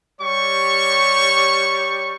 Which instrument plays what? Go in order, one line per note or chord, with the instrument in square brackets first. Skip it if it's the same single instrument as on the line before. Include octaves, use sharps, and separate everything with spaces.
[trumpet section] G3 G4 C#5 C#6